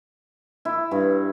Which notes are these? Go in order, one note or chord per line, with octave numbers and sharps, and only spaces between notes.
E4
G2